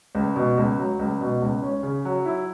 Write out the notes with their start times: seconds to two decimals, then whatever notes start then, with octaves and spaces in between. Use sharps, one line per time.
0.15 C#2
0.36 B2
0.58 C#2
0.78 F#3
0.99 C#2
1.21 B2
1.42 C#2
1.62 C#4
1.83 C#3
2.05 F#3
2.25 E4